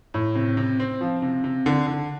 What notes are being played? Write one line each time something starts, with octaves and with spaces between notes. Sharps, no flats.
A2
C3
C3
C4
F3
C3
C3
D3
D3